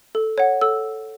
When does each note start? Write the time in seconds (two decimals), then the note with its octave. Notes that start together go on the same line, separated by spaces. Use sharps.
0.15 A4
0.38 C#5 F#5
0.61 A4 E6